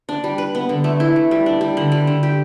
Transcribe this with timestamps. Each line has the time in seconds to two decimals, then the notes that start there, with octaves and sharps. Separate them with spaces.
0.09 D4
0.24 G3
0.38 B4
0.55 B3
0.69 D3
0.84 A3
1.00 E4
1.16 A3
1.31 G3
1.46 D4
1.61 G3
1.77 D3
1.92 G3
2.07 D3
2.23 G4